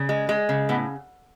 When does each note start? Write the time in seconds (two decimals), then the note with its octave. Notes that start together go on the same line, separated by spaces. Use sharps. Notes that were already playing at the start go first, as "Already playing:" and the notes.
Already playing: C#3
0.09 G#3
0.29 G#3
0.49 C#3
0.69 A2 B3